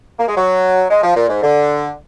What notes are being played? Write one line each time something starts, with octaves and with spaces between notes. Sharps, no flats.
A#3
G#3
F#3
G#3
F3
A#2
G#2
D3